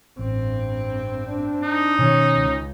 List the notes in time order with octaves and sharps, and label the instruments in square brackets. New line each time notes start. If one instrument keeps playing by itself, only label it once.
[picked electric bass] A1 [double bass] G2 C4
[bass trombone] D4
[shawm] D#4
[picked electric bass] B2 D#3 [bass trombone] C#4
[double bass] C#2